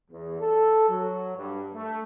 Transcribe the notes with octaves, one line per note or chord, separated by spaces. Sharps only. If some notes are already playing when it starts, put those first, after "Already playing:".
E2
A4
F#3
G2
A3